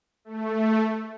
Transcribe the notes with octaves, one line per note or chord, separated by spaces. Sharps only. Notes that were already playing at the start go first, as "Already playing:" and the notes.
A3